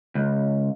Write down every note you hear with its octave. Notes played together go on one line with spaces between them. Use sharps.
C#2